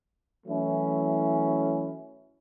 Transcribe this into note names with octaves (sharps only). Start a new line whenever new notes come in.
E3 F#3 A3 C#4 E4